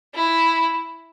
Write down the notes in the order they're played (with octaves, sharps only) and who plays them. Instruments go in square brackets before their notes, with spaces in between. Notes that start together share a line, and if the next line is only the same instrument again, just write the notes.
[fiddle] E4